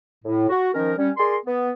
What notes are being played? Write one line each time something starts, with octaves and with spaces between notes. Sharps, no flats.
A2
F#4
D#3 F3 C#4 A#4
G3 C#4
G#4 A#4 D5 C6
B3